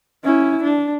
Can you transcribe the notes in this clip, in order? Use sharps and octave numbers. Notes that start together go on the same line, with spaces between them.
C#4 E4
D4